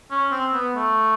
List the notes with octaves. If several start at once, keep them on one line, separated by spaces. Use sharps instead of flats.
C#4
C4
B3
A3